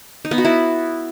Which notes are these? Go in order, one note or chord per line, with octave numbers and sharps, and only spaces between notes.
D#4
B3
F#4
E4